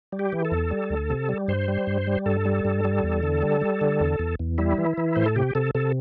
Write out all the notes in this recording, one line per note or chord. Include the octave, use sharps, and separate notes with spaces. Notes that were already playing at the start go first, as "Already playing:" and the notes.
G3
G4
E3
A4
E2
G3
D2
C3
G3
G2 C5
G3
G2
G3
G2 A4
G3
G2
G3
E2
D3
G3
G3
D3
E2
E2
E2
G3 E4
E3
E3
A2 C5
A4
C3 G4
C3 A4
C3 A4